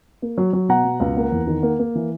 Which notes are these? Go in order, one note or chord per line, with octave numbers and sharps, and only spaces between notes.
A#3
F#3
F#3
B2 F#5 A#5
B2
C#2
A#3
E2
D#3
A#3
A#3
E3